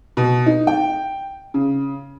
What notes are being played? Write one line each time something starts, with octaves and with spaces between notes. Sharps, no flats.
B2
D#4
G5
C#3